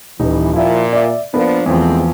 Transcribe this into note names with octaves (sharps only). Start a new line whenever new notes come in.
D#1 E3 D#4
A#2 F3 E4
D5 E5
F3 A#3 B3 D4 A#4
E2 F3 G#3 A3 C4